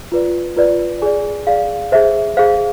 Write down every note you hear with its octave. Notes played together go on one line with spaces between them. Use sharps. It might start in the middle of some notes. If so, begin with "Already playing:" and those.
F4 B4 D5
F4 B4 D5
G#4 D5 G#5
G#4 D5 F5
G#4 C5 E5
G#4 C5 F5